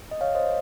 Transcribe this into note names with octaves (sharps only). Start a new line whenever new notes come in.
D#5
C#5 F5
C5 D#5